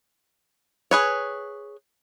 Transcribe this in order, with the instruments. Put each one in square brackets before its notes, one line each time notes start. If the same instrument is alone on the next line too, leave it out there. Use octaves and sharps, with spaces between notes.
[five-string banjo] G#4 B4 C#5